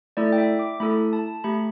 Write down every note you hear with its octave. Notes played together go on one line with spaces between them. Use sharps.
A3 E4 A4 D5
G5
E5
D6
A3 E4 A4 B5
A5
A3 G4 B5